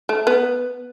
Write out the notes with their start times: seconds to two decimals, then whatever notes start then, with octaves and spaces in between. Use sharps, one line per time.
0.09 A3
0.27 B3